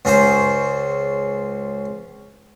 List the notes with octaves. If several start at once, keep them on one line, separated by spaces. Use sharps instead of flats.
C#2 C#4 G#4 C5